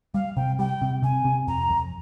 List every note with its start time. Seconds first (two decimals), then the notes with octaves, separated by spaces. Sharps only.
0.14 G3 F5
0.36 C3 G5
0.59 G3 G5
0.82 C3
1.02 C3 G#5
1.25 C3
1.47 F2 A#5
1.70 F2